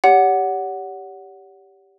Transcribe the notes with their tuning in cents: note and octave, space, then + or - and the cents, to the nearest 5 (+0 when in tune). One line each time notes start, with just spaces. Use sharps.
G4 +0 C#5 +40 F#5 +0